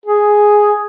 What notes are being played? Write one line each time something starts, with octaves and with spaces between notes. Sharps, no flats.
G#4